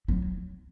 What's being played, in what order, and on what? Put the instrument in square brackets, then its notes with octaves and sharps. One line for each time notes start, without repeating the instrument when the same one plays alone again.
[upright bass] F#3